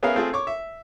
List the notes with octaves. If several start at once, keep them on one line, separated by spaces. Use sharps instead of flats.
B3 C#4 G#4 A#4 E5 F5
A3 C4 F4 G#4
C#5 C#6 D6
E5